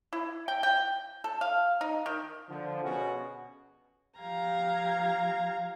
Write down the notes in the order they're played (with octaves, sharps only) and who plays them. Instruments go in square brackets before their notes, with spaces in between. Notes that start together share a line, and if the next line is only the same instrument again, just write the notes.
[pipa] E4
G5
G5
A4
F5
D#4
D#3
[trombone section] D3 F3
B2 C#4 F#4 G#4
[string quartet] F3 G4 F5 A#5 G#6